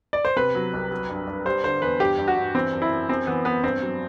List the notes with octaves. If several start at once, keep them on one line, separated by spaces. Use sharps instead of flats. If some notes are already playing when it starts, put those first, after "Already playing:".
D5
C5
C3 B4
F#3
C2
F#3
G2
G2
G3 C5
D3 C5
E2 B4
G2 G4
G2
F#4
G2
E3 C4
F#2
E4
F#2
F#2 C4
E3 B3
F#2 B3
G2 C4
F#3